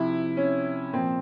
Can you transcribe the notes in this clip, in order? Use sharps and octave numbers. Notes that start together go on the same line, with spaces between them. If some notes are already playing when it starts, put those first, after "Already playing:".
Already playing: C3 F3 E4
C#4
A#2 F3 C4